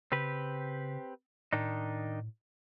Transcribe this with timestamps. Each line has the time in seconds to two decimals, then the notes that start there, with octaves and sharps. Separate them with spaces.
0.12 C#3 C4 G4 B4
1.53 A2 D#3 D4 D#4